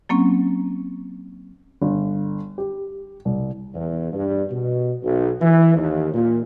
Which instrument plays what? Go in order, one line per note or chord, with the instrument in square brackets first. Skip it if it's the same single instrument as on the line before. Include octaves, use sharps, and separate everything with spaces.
[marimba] F#3 A#3 C4 C#4
[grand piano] G1
G4
C2
[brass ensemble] E2
G2
B2
B1
E3
D#2
A#2